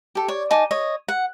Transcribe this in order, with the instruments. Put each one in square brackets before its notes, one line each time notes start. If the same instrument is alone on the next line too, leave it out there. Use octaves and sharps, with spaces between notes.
[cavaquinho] G4 A4
C#5 D5
D#4 G#5 A5 D6
C#5 D#5
F#5